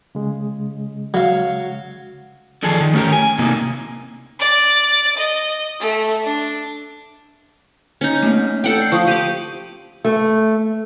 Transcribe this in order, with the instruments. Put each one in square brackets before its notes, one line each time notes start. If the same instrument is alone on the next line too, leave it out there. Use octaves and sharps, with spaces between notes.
[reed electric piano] C#3 G#3
[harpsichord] F#3 F5
[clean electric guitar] D3 D#3 F3 D4 G#4 A4
D#3
A3 C#4 F4 G4 A#4
G#5
C3 A#3 D#4
[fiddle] D5
D#5
A3
D4
[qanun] C#4 D#4
[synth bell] A3 A#3 C4
[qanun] A4 F#5 G5
[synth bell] D5 C7
[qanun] F3 [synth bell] C#6 D#6 F#7
[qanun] G4 D6 [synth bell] D#7
[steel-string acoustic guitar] A3